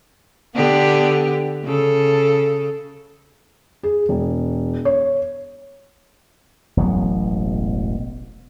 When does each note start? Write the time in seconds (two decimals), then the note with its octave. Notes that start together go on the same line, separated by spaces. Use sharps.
0.55 D3 B3 G4
1.65 C#3 A4
3.83 G#4
4.09 E1
4.85 C#5
6.77 E1 A1 F#3 B3